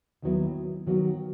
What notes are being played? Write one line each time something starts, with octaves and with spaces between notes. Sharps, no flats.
D#2 D#3 F#3 B3 E4
D#3 F#3 B3 F#4